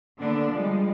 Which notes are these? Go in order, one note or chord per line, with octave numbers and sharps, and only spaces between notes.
D3 A#3 B3 D4
F3 G3 G#3